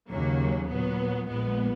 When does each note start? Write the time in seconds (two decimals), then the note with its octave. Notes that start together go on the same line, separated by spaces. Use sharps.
0.09 D#2 C#3 F#3 A#3
0.68 A#2 F#3 B3
1.27 A#1 A#2 G#3 B3